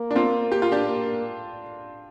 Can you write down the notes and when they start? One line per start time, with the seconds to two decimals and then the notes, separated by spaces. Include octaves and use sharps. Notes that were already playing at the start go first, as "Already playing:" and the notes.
Already playing: A#3
0.11 D4
0.15 C4 F4
0.52 G4
0.62 F4
0.72 D4 G4
0.87 A#3